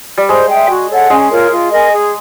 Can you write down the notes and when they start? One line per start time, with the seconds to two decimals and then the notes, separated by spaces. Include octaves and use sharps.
0.18 G3
0.29 G#3 C5
0.49 E5 G5
0.69 F#4
0.90 A4 C#5 F#5
1.10 G#3 C#4
1.31 F4 A#4 C#5
1.51 F4
1.72 A#4 D#5 G#5
1.91 G#4